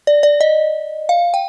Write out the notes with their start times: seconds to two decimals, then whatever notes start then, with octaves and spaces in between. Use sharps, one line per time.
0.07 D5
0.23 D5
0.41 D#5
1.09 F5
1.34 G5